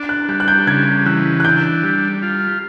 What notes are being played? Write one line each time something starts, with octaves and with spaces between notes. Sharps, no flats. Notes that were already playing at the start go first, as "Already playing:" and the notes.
Already playing: D4
F#6
G3 F#6
F#6
G6
C#3 G#6
E3 F#6
F#6
D4 G6
G3
F4